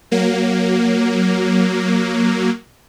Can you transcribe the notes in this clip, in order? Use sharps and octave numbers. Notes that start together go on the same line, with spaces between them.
F#3 A#3